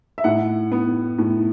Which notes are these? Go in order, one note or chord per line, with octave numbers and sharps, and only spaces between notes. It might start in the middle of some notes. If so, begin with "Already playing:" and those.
E5
A2 F#5
B3
A2